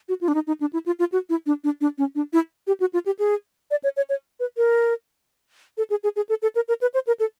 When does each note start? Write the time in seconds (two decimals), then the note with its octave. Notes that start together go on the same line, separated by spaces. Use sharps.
0.09 F#4
0.21 F4
0.28 D4
0.34 D#4
0.47 D#4
0.61 D4
0.73 E4
0.86 F4
0.99 F4
1.12 F#4
1.30 E4
1.46 D4
1.64 D4
1.81 D4
1.98 C#4
2.15 D4
2.33 E4
2.67 G4
2.80 F#4
2.93 F4
3.06 G4
3.19 G#4
3.71 D5
3.84 C#5
3.97 C#5
4.09 C#5
4.40 B4
4.57 A#4
5.78 A4
5.90 G#4
6.03 G#4
6.16 G#4
6.29 A4
6.42 A4
6.55 A#4
6.68 A#4
6.81 B4
6.94 C5
7.07 A#4
7.20 A4